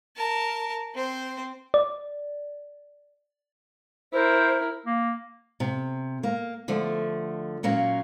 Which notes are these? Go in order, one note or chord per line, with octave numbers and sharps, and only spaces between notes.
A#4 A5
C4 C5
D5
E4 A#4 C5
A#3
C3
A#3
D3 F3 A3
A#2 F#3 A#3 C#4